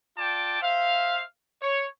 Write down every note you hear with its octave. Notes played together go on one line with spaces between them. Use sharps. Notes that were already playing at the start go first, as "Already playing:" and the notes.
F4 D5 G5 A5 D6
C5 E5 F5
C#5